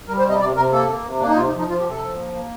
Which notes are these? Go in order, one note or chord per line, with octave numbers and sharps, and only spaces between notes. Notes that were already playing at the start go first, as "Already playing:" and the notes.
G3 A#4
C5
C3 D#5
C3 D5
C3 A#4
A#3 A4
A#3
C3
A#3 D4
D#4
C3 F4
D#4
F3
D#4
F3 F4
G4
C3
A4
F3
A#3
A#3